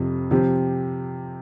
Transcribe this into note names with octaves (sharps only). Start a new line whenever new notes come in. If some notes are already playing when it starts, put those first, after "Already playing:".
Already playing: F2 C3 F3
C3 F3 C4 G4